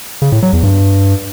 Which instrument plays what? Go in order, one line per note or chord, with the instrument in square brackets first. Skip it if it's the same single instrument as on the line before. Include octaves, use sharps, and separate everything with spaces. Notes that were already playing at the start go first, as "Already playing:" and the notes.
[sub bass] C#3
A2
F#3
E2
G2